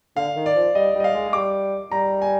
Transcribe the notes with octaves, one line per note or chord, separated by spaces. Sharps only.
D3 F5
D#3
D5
F3
G3 D#5
G3
D#5
F5
G#3
G#3
G3 D6
G3 A#5
G#5